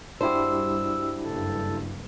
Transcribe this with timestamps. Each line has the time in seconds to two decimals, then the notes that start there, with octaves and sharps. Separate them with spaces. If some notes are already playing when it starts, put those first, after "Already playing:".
0.21 G2 G3 D4 E4 F#4 G4 C5 E6
1.25 F#1 G2 A4